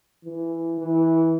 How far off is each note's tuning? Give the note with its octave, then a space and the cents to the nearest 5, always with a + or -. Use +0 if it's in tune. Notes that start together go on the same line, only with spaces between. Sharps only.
E3 +10
E3 -15